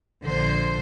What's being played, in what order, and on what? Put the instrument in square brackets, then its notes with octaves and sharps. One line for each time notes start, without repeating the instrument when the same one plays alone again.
[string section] A#1 D3 C5